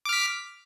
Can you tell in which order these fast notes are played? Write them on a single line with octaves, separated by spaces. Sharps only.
D6 F6 B6